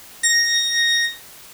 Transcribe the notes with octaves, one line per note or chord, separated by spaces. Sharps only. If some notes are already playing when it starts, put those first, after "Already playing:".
A#6